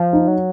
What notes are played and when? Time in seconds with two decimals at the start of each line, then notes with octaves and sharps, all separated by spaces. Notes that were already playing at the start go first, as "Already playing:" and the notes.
Already playing: F3
0.13 D#4
0.28 F#3